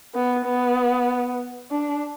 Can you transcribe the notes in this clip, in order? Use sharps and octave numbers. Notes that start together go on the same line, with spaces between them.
B3
B3
D4